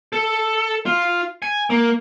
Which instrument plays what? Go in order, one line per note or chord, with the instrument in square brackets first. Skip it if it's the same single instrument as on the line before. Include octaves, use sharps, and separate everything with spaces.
[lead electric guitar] A4
F4
G#5
A#3